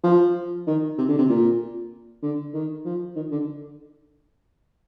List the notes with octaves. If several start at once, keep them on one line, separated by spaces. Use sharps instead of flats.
F3
D#3
C3
D3
C3
A#2
D3
D#3
F3
D#3
D3